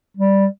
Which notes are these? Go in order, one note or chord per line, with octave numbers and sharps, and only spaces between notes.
G3